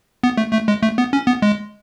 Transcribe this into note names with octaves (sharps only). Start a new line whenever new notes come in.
B3
A3
A3
G#3
A3
B3
C#4
B3
G#3